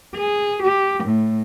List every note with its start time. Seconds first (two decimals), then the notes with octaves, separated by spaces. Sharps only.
0.16 G#4
0.63 G4
1.04 A2